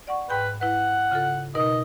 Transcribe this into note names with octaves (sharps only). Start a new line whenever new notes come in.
D5 F#5 C#6
G#2 B4 G5 G6
E4 B4 F#5
C#3 F4 A4
B2 D#4 A#4 D#5